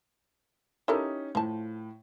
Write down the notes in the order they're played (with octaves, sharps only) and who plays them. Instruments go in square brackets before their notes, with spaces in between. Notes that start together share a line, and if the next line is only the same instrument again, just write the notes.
[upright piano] C#4 D#4 G4 [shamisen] E4 A4 A#4
[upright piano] A2 [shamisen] F3 A5